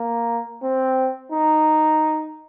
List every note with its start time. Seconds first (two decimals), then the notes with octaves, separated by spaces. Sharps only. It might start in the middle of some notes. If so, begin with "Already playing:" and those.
Already playing: A#3
0.63 C4
1.32 D#4